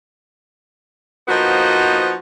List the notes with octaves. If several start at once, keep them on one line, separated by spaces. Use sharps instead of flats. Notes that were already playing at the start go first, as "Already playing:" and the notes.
F3 A#3 B3 D#4 F#4 C5